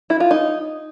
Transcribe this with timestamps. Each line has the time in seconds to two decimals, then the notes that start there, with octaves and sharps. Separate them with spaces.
0.10 E4
0.20 F4
0.31 D#4